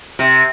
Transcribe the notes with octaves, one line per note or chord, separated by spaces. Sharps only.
C3